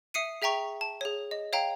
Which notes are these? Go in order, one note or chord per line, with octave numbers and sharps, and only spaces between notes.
E5 D#6 C7 C#7 D#7
G#4 E5 G5 A#5 C#6
A5
G#4 C#5
D#5
C#5 F5 G5 A#5